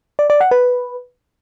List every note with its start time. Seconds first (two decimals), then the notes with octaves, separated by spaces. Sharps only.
0.19 D5
0.30 D5
0.41 F#5
0.51 B4